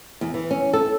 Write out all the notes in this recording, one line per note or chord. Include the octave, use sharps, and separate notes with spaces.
E2
E3
C#4
A4